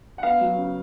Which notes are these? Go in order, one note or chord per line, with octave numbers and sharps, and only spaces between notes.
F#5
B3 F5
F#3
C#3